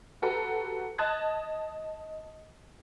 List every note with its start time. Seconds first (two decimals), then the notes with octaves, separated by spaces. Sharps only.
0.22 F#4 G4 A4 B4 A#5
0.98 D#5 A5 D#6 F#6 G#6 A6